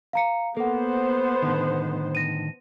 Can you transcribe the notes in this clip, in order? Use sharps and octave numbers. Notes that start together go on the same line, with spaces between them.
F5 A#5 C#7
A#3 B3 A4 C5 F#5
A2 D3 D#3
A#6 D#7